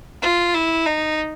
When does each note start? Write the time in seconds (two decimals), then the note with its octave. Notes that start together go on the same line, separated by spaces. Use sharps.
0.22 F4
0.55 E4
0.86 D#4